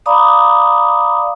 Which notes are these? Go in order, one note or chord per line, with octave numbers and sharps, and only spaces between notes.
D5 F5 A#5 B5 D6 D#6